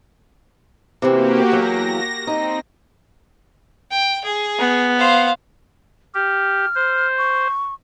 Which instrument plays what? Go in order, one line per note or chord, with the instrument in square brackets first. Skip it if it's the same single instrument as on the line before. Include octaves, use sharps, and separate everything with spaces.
[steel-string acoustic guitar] C3 E3 C4 [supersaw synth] A#3 F#4 G4
[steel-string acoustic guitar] E2 F#3 [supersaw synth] A#6
[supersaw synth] C4 [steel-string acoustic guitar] D#4
[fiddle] G5
G#4
[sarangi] B3
[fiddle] C5 F5
[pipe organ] G4 [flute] F6
[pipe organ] C5
[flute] C#6